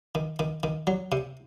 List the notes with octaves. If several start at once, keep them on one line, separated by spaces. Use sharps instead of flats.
D#3
D#3
D#3
F#3
C3